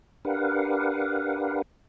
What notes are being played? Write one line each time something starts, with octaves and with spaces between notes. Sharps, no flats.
D4 G4 A#4 B4 F5 F#5